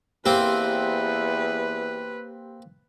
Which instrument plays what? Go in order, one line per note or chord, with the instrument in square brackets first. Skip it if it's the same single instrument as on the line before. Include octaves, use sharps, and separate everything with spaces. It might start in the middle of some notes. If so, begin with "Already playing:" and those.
[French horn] E2 [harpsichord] A#3 C4 [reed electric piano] G4 [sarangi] B4